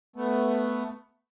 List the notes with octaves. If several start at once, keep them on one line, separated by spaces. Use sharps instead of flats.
A3 B3